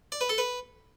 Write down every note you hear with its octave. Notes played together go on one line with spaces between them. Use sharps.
D5
B4
A4
B4